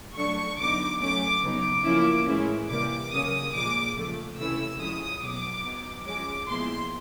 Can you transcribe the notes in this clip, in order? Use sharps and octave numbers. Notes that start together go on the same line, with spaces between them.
F#3 A3 D4 C#6
D3 F#3 B3 D#4 D6
F#3 A3 C#4 D6
C#3 F#3 B3 D#4 D6
F3 A#3 C#4 E4
A2 E3 G#3 C#4 E4
C3 E3 G3 A#3 D6
C#3 F#3 A#3 C#4 D#6
A#2 F3 G#3 D6
C#3 F3 A3
C3 E3 A3 C#4 E4 E6
F3 G#3 C#4 E4 D#6
B2 F#3 B3 D6
F#3 B3 D#4
F3 G#3 C#4 D6
A#2 F3 G#3 B3 E4 C6